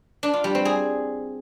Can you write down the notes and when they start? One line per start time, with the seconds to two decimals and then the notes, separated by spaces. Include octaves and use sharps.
0.23 D4
0.33 F4
0.44 G3
0.55 C4
0.65 G#4